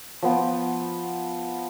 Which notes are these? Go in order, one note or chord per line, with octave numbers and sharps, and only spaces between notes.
F3 B3 G5